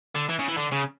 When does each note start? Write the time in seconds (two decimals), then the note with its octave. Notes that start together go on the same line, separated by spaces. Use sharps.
0.15 D3
0.29 E3
0.39 C#3
0.48 E3
0.57 D3
0.72 C#3